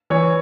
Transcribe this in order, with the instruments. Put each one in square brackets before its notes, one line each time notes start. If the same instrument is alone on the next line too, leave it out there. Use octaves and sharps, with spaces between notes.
[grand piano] E3 C#5